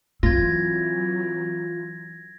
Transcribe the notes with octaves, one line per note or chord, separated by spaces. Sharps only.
E3 F#3 C4 F4 G#6 A#6